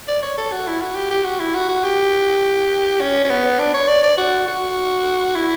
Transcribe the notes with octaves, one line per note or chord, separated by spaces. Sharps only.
D5
C#5
A4
F#4
E4
F#4
G4
G4
F#4
E4
F#4
F#4
G4
C#4
C#4
B3
D4
C#5
D5
D5
F#4
F#4
E4